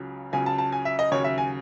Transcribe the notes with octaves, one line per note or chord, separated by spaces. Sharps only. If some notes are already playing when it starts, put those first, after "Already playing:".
Already playing: C#2 C#3 F#3
C#2 C#3 F#3 G#5
A5
A5
G#5
E5
D#5
D#2 C#3 F#3 C#5
E5
G#5